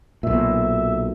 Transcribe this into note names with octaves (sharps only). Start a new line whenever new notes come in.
B1 A#2 E5